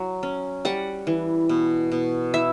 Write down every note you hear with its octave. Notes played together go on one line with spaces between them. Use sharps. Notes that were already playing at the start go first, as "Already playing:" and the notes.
Already playing: F#3
C#4
G3 F#5
E3
B2
B2
E4 E5